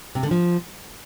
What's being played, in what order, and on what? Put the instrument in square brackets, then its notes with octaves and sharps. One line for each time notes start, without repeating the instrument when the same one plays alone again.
[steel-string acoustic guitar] C3
D3
F3